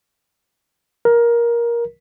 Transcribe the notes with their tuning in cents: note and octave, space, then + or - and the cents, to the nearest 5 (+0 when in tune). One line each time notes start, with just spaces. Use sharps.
A#4 +15